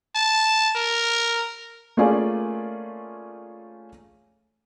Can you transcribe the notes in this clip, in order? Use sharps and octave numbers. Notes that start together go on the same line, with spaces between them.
A5
A#4
A3 A#3 C#4 F4 G#4 D5